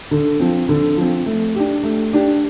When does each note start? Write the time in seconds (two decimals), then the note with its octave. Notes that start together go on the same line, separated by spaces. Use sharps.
0.11 D3
0.40 F3 C4
0.69 D3
0.97 F3 C4
1.26 A3
1.55 D4 G4
1.83 A3
2.13 D4 G4